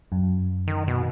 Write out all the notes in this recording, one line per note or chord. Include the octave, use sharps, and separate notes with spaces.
F#2
D#3
B2